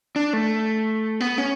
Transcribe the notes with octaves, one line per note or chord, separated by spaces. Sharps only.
D4
A3
B3
C#4